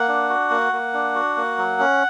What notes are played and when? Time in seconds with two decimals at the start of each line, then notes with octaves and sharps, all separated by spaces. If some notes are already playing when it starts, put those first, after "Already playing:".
Already playing: A#3 F#5
0.08 D4
0.29 F#4
0.50 A#3
0.73 A#3
0.93 D4
1.15 F#4
1.37 A#3
1.58 F#3
1.79 C#4